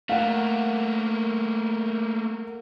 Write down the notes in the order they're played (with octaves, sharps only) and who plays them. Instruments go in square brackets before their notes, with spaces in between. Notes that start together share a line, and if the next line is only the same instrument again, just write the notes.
[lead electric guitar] A3 A#3 [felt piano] F5 F#5